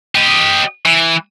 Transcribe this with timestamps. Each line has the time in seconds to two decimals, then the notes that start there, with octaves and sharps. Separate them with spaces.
0.15 G4 D#5
0.86 E3